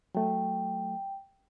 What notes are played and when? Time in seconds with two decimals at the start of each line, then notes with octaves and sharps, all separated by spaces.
0.15 F#3 A3 G5